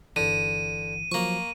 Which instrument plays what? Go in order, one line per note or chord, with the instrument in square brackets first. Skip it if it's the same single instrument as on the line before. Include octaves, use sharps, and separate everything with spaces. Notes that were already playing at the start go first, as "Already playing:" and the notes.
[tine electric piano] G1 E3 [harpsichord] D3 [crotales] D#7
[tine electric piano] F3 F#3 [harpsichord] A#3 C#6